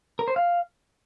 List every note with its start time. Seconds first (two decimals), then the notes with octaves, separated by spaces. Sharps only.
0.19 A#4
0.28 C5
0.36 F5